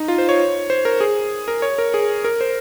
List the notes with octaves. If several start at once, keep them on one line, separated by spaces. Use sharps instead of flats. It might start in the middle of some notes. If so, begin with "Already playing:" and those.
Already playing: D#4
F4
C5
C#5
C5
A#4
G#4
A#4
C#5
A#4
G#4
A#4
C5